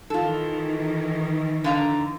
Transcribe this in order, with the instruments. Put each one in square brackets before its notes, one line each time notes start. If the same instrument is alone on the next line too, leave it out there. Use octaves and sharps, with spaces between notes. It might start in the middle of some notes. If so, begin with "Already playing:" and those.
[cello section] D#3 E3 [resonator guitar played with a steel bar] F4 A4
[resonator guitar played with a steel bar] D3 F5 A#5